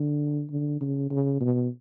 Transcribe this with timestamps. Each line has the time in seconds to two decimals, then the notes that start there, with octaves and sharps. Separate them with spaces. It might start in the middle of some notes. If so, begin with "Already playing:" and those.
Already playing: D3
0.50 D3
0.81 C#3
1.10 C#3
1.40 B2